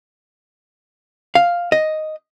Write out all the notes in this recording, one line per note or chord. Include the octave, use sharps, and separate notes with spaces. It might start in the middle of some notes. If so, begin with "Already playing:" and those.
F5
D#5